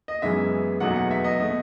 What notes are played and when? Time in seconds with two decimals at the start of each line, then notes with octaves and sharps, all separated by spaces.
0.08 D#5
0.22 F#2 C#3 E3 G#3 B3 E5
0.80 E2 B2 F#3 A3 D#4 F#5
0.96 F#5
1.11 E5
1.24 D#5
1.40 B2 A3